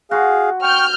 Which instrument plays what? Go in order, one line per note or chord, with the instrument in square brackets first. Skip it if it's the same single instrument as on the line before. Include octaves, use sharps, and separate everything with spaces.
[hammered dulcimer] F#4 C6 [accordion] G#4 F5
[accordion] G5 C#6 [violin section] F6 G6